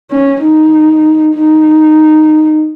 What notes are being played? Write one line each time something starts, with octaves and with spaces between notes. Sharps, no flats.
C#4
D#4
D#4